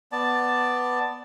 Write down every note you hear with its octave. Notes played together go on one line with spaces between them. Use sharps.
B3 D5 A5